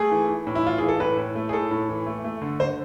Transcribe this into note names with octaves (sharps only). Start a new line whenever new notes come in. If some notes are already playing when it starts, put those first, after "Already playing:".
Already playing: A3 G#4
E3
E3
A2
E4
E3 F4
E3 G#4
A4
A2 B4
A2
A3
G#4
A2 A4
A2
E3
A3
A3
D3
D3 C5